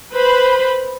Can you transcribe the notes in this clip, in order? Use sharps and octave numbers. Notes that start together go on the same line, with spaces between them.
B4 C5 B5